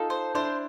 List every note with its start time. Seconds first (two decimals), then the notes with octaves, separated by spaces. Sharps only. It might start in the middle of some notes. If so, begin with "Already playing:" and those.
Already playing: D#4 F4 A4
0.10 C5
0.35 D4 E4 C5